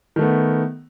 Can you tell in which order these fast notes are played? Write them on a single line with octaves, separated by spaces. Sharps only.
D#3 A3 B3